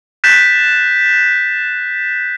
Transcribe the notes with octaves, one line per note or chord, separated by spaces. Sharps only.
F#6 G6 A6 B6 E7